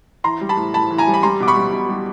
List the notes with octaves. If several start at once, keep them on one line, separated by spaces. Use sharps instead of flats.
E3 A#5 C6
G3
A5 B5
A2
A2 A5 B5
E3
G#5 A#5
G3
B5
G3 A#5 C6
B2 D6
B5 C#6
G3
B2
G3